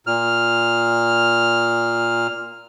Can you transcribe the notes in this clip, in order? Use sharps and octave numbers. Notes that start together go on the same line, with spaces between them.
A#2 F6